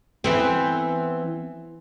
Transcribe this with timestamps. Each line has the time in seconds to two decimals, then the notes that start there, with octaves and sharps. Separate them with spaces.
0.24 E3 B3 C4